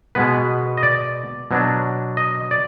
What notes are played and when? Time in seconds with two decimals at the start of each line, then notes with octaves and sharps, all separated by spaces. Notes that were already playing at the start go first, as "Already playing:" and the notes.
0.15 B2 G#3 B3 B4
0.77 D#5
0.83 D5
1.51 B2 F#3 D4
2.17 D#5
2.51 D5